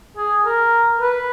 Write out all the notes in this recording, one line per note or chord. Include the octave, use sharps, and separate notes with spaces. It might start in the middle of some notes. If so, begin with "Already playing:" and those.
G#4
A#4
B4